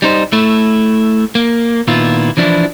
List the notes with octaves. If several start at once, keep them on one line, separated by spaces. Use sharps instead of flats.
G3 D#4 C5
A3 E4
A#3
A#2 D#3 B3 E4 F4
E3 F3 D4 E4